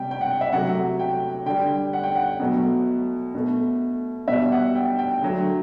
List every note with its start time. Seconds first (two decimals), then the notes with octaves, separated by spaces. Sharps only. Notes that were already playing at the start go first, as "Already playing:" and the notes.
Already playing: C3 G3 G5
0.11 G5
0.21 F#5
0.41 E5
0.53 C3 F#3 A3 F#5
0.99 G5
1.46 D3 G3 G5
1.93 F#5
2.04 G5
2.15 F#5
2.40 B2 F#3 A3
3.35 B2 A3
4.28 B2 G3 E5
4.52 F#5
4.75 G5
4.99 G5
5.22 D3 F#3 A3